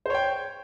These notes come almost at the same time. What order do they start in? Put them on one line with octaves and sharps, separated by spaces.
C5 C#5 G5